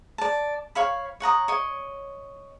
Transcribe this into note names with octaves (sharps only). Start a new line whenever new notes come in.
D5 A5
C#5 F5 B5
C#5 F#5 A#5 D#6
C#5 D#5